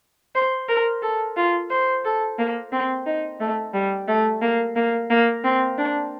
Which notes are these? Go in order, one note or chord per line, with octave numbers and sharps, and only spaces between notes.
C5
A#4
A4
F4
C5
A4
A#3
C4
D#4
A3
G3
A3
A#3
A#3
A#3
C4
D4